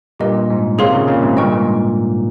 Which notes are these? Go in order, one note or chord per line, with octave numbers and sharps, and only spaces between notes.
G2 A#2 G4 A#4 D#5
G#2
C3 D#3 G#4 C#5 F5 C6
A#2 C#3
A#2 C#3
G#2 C3
G2 A#2 D#5 G5 C#6 F6
G#2